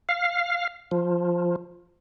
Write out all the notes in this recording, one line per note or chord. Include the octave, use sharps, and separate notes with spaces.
F5
F3